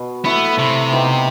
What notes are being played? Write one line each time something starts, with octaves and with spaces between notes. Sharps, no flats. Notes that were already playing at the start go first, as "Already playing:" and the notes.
Already playing: B2
A3 B3 E4 A4
C3
B3 D#4 G4